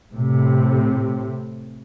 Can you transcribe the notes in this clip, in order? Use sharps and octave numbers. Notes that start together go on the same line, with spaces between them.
A2 C3